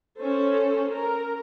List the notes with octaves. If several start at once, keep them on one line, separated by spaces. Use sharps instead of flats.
C#4 A4 C5
A#4